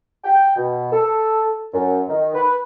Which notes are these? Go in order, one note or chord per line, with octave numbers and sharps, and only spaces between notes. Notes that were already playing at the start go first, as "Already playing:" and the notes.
G5
B2
A4
F#2
D#3
B4